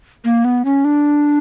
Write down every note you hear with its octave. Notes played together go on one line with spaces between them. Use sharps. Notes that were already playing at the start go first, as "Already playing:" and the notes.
A#3
B3
C#4
D4